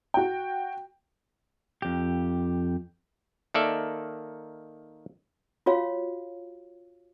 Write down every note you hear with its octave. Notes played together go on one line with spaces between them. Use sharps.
F#4 G5
F2 G4
D#3 A#3 A4 D5 E5
F4 F#4 C#5 F5